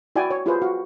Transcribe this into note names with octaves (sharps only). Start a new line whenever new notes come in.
E4 F#4 D5 G5 G#5
C#5
E4 F4 G4 G#4 B4 C5
F#4 F5